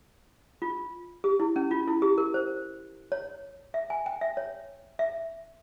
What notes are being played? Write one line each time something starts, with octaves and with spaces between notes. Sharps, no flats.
F4
G4
E4
C#4
F4
E4
G4
A#4
C5
C#5
E5
G#5
G5
E5
C#5
E5